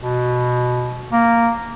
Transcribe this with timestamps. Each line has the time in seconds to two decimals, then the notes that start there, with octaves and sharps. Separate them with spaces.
0.01 B2
1.12 A#3